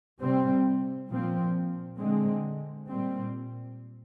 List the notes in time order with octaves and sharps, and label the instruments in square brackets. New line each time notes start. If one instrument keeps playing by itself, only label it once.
[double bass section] C3 G3 C4
A#2 F3 C4
D3 G#3 C4
A#2 G3 C4